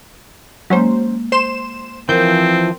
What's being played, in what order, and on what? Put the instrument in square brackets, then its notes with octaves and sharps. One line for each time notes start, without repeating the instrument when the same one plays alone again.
[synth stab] F#3 C#4 C5 [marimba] G#3 A#3
[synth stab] C5 C6 E7
[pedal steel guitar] E3 F3 [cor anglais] C4 [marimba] A#4 [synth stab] G6